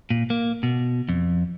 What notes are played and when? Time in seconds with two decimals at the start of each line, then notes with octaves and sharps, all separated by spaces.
0.10 A#2
0.30 A#3
0.63 B2
1.09 F2